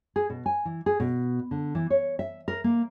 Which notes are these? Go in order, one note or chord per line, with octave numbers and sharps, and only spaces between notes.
G#4
B2
G#5
E3
G#4
B2
D3
E3
C#5
E5
A#4
A#3